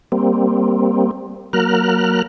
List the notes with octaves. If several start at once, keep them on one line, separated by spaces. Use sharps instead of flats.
G3 A#3 C4
F#3 A#3 A#4 F6 F#6